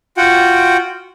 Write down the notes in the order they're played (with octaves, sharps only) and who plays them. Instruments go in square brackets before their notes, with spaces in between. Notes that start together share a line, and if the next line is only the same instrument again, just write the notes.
[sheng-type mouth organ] F4 F#4 F#5 G5